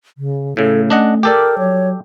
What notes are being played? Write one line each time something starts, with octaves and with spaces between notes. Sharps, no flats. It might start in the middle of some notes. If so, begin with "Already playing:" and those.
C#3
A2 C#3 A3 A4
C#4 D4 D#5 F#5
G4 A4 A#4 D5
F#3 C#5